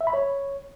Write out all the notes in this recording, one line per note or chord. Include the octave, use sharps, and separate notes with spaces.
E5
B5
C#5